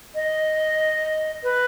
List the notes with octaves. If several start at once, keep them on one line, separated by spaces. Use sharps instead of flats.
D#5
B4